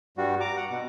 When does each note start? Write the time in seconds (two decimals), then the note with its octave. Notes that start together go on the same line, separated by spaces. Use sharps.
0.17 G2 G3 F#4
0.40 A#5 D6
0.57 F#5
0.70 B2